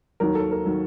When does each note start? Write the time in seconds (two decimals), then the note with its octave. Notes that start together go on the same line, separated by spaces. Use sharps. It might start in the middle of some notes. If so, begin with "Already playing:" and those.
0.20 D#2 D#3 F#3 A#4
0.35 A4
0.51 A#4
0.65 D#3 F#3